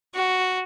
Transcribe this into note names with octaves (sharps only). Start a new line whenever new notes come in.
F#4